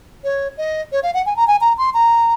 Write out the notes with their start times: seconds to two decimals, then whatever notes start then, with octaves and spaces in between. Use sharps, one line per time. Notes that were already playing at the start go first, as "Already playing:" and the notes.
0.24 C#5
0.58 D#5
0.92 C#5
1.03 F5
1.14 F#5
1.26 G#5
1.36 A#5
1.48 G#5
1.61 A#5
1.78 C6
1.94 A#5